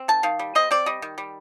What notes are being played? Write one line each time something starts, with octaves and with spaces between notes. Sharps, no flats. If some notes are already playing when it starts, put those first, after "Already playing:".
Already playing: C4
D#3 A5
D#3 F5
G3
C4 D#5
C4 D5
G3 D#5
D#3
G3